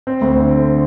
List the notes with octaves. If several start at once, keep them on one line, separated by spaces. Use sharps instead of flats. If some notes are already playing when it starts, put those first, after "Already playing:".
C4
D2
D3